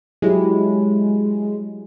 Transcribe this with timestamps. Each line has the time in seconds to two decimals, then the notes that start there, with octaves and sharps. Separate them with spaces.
0.22 F#3 G#3 E4 G4